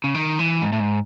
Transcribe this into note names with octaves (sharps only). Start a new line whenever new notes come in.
C#3
D#3
E3
G#2
A2
G#2